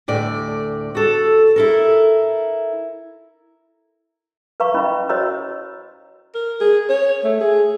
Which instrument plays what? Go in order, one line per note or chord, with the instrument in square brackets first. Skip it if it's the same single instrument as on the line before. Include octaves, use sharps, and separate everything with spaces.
[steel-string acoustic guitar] D2 A2 D5
F#4 A4
E4 A4 A#4
[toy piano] B4 F5 A#5 C#6
C#4 E4 D#5 B5
F#4 C5 C#5 D#5 A#5 E6
[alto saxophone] A#4
G#4
C#5
A3
G#4